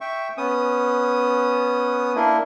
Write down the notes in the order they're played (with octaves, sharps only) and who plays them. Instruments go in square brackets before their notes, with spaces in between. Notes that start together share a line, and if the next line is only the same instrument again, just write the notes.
[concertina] E5 G5 C#6
B3 C#4 D#6
A#3 D4 E4